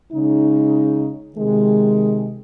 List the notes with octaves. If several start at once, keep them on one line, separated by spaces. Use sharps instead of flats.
C#3 G#3 D#4
C3 D#3 G#3